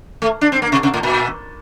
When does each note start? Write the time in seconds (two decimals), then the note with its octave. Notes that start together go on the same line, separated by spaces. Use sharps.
0.22 A3
0.41 D4
0.52 C4
0.62 A#3
0.72 C3
0.83 C3
0.94 A2
1.03 A#2